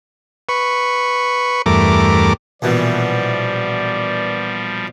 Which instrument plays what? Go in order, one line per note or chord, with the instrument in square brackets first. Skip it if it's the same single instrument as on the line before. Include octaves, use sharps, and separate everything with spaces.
[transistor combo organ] B4 C#6
E2 G2 A3 A#4 D6
[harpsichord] A#1 B2 E3 [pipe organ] F3 G3 [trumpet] D5